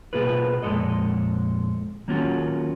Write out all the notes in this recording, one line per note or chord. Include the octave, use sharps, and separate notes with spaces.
B2 A#3 F4 G#4 B4
F2 A#2 G#3 A4 D#5
D#3 F#3 A#3 C#4 F4 F#4